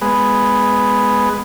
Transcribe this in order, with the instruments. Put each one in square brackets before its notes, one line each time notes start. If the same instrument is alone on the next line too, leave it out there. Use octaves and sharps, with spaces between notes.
[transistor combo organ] G#3 B3